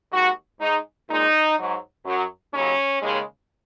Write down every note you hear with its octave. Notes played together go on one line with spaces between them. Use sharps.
D#2 D#3 G#3 F#4
G#2 G#3 D#4
A#2 G#3 D#4
G#2 F#3
F#2 F#3
D#2 C#3 F#3 C#4
D#2 C#3 G#3